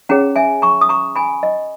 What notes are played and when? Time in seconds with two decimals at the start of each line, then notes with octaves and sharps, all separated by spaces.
0.09 C#4 G#4 C#5 F#5 A#5
0.36 E5 G#5
0.62 A#5 C#6
0.81 D#6
0.89 A#5 C#6
1.16 G#5 B5
1.43 D#5